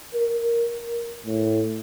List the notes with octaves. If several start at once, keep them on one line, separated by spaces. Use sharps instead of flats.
A#4
A2